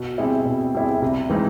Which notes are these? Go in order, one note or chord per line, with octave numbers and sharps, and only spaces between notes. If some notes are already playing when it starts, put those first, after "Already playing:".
Already playing: B2
G3 C4 E4 G#4
B2
G3 C4 E4 G#4
C3
E3 G#3 C4 D#4